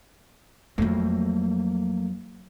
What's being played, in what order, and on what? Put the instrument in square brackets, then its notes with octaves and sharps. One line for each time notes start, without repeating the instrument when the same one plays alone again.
[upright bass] F2 F#3 [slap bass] A3 A#3